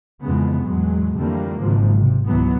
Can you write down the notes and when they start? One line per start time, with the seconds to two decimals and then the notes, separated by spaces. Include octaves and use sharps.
0.22 F2 C#3 E3 G#3 B3
0.61 E2 A2 F#3 G#3
1.17 F2 D3 E3 G3 A3 A#3
1.61 G#1 G#2 C#3 F3 F#3
1.98 C3
2.27 G#1 C#2 B2 E3 F#3 B3